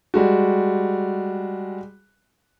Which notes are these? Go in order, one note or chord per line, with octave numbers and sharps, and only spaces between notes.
G3 G#3 F#4